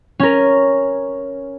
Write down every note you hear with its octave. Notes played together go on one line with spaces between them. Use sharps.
C#4 A#4